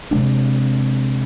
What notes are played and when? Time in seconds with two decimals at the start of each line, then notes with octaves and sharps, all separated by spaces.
0.11 C3 G#3 B3 D4